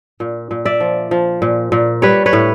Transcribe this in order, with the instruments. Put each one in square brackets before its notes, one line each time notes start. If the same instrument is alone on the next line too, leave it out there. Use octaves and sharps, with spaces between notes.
[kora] A#2
A#2
D5 E5
F3
F3
A#2
A#2
G3 B4 C#5
B4 C#5
A2